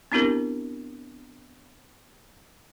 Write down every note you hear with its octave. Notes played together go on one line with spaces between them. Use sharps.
B3 C4 D4 E4 G4 A#4